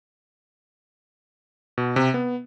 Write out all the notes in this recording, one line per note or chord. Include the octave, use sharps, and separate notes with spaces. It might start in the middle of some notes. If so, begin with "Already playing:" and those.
B2
C3
B3